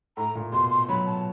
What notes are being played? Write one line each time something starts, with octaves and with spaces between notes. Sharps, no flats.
A2 A#5
A#2
B2 C6
C6
F#3 B5
A5